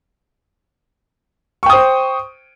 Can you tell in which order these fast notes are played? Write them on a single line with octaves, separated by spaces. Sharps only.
C#6 G5 D#6 C5